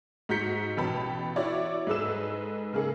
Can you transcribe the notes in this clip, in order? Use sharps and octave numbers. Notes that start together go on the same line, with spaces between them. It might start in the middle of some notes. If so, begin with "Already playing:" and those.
G#2 F#4 A#5 G6 B6 C#7
A1 B2 B3 G5 A5 B5
E4 F#4 C#5 D5
G#2 G#3 A4 B4 E6 E7
C#3 A#3 G#4 A4